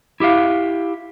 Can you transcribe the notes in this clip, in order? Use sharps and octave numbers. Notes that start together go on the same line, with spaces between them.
E4 G4 E5 F5